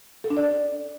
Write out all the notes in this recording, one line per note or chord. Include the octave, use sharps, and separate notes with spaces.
A4
D4
D5